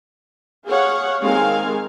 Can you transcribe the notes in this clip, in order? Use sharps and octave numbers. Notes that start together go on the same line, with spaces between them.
G#4 C#5 F5 F#5
D#3 G#3 C4 F5 G#5